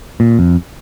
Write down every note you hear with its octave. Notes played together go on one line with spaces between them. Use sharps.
A#2
F2